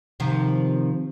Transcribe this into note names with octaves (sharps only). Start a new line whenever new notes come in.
C3 D#3 F3